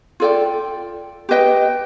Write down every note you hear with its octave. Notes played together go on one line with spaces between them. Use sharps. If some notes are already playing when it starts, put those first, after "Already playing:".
F4 A4 D5 G5
G4 B4 D#5 G5